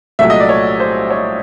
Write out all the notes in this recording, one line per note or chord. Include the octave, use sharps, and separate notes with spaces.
C2 A#2 F#3 A3 E5
D#5
D5
C#5
C5
C#5